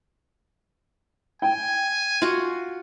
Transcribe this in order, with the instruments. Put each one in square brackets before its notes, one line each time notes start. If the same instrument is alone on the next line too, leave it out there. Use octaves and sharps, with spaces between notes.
[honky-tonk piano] G5 [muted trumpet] G#5
[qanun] F4 F#4